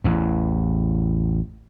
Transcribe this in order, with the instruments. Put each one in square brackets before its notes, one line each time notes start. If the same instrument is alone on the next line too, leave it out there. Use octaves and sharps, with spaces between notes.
[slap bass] A1 E2